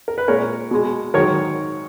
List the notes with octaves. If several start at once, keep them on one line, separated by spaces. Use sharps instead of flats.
A#4
B4
A#2 G#3 A#4 C#5
B2 G#3
G#2 D#3 F#3 A#4 C#5